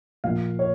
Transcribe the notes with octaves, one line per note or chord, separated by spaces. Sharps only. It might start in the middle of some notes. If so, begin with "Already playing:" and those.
A#2 F3 A#3 F5
C#5